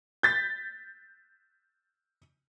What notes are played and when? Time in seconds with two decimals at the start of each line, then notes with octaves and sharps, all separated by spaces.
0.23 G6 A6 B6